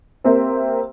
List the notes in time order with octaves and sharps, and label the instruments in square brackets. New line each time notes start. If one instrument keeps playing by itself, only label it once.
[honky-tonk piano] A#3 C4 G4 A#4 C5 E5